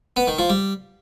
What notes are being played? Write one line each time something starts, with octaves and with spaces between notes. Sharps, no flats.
B3
D#3
F3
G3